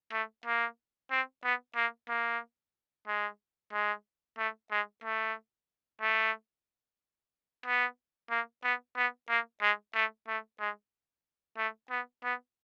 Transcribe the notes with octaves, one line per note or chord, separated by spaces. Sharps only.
A3
A#3
C4
B3
A#3
A#3
G#3
G#3
A3
G#3
A3
A3
B3
A#3
B3
B3
A#3
G#3
A3
A3
G#3
A3
B3
B3